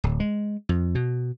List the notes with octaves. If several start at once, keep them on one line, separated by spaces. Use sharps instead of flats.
D1
G#3
F2
B2